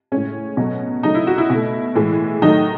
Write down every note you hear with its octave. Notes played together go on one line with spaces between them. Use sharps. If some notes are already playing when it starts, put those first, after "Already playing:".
A2 G#3 C#4
B2 F#3 A3
C#3 F#3 A3 D#4
E4
F#4
E4
B2 A3
A2 E3 G#3
D#3 F#3 A3 D#4